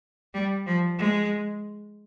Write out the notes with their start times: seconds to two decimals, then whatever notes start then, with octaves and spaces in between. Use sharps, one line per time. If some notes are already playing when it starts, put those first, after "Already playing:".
0.34 G3
0.66 F3
0.98 G#3